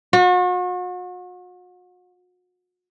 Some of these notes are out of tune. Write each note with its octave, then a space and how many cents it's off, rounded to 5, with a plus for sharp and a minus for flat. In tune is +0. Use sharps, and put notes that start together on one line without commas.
F#4 -40